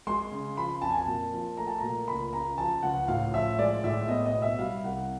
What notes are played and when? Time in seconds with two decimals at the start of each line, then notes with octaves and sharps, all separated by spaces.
0.07 G#3 C6
0.32 C#3
0.57 F3 B5
0.82 F2 A5
0.90 G#5
0.97 A5
1.07 A#2
1.33 F3
1.57 A3 A#5
1.67 A5
1.78 A#2 A#5
2.08 C#2 B5
2.33 C#3 A#5
2.58 F3 A5
2.83 C#2 F#5
3.08 A2 F5
3.33 F3 E5
3.59 G#3 D5
3.84 A2 E5
4.08 B3 D#5
4.26 D#5
4.34 B2
4.42 E5
4.59 G3 F5
4.84 C2 F#5